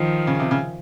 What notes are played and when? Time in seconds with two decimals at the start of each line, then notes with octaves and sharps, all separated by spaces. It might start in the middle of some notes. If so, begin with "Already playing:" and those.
Already playing: D#3 F3
0.27 C#3
0.39 C3
0.51 C#3